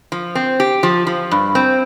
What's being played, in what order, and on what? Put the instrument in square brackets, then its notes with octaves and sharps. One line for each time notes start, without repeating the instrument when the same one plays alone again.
[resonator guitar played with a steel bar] F3
C4
G4
F3
F3
G2
C4